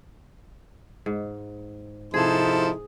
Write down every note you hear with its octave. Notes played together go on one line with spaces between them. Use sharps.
G#2
C3 F3 D#4 E4 G#4 A4 C5